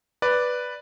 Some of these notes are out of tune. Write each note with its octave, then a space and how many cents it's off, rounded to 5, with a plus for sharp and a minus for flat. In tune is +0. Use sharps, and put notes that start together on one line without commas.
B4 +0 D5 +0